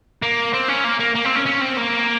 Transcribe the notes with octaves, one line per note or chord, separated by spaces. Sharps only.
A#3
C4
C#4
A#3
A#3
A#3
C4
C#4
C#4
C4
A#3